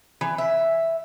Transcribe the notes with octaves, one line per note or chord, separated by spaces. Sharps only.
E3
E5